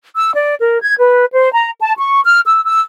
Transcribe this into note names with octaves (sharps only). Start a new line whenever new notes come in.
E6
D5
A#4
G#6
B4
C5
A#5
A5
C#6
F6
E6
E6